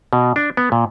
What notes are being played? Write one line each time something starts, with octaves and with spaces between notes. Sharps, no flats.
B2
D4
B3
A#2